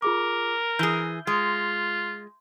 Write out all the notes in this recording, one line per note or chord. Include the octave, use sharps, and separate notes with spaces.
F4 G#4 A#4 D6
E3 G#4 G6 G7
G#3 F4